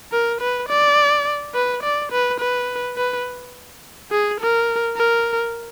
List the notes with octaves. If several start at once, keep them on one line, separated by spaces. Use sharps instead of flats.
A#4
B4
D5
B4
D5
B4
B4
B4
G#4
A#4
A#4